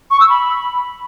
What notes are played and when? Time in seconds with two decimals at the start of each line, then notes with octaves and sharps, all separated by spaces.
0.11 C#6
0.20 E6
0.30 B5